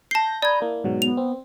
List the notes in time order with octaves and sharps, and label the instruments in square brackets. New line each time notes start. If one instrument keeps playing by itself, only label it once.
[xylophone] A5 C7 [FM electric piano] G6 A#6
[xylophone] D5 G#6 [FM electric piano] A#5 D#6 G6 [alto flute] B5
[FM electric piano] A#3 [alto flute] E4
[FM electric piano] G#2 B2 F#3
[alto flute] B3 [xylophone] F7
[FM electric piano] C4